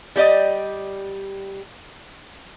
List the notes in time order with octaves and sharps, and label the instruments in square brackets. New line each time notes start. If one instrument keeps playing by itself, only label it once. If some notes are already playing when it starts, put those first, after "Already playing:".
[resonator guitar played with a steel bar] G3 G4 D5 D#5